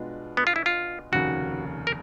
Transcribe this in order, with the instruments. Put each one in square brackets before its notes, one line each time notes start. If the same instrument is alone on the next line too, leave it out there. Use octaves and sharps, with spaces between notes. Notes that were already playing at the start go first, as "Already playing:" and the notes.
Already playing: [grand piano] B2 G#3 B3 D4 F4
[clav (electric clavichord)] B3
F4
E4
F4
[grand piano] F1 D#2 C#3 [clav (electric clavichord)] F#4
[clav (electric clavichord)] A#4